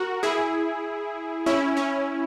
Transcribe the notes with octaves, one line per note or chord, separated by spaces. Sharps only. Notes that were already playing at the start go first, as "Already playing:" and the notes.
Already playing: F#4 A#4
E4 G#4
C#4 E4
C#4